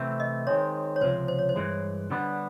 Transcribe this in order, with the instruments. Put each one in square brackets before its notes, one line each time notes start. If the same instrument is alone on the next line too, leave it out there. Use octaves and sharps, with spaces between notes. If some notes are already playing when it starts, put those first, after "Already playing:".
Already playing: [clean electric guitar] C3 E3 A3 C4
[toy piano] D#5
[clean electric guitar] D#3 G#3 C4 [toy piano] C#5
[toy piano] C#5
[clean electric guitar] C#2 C3 F3 [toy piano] C5
[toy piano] C5
C#5
C5
[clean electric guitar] G2 E3 G#3
D3 G3 B3 D4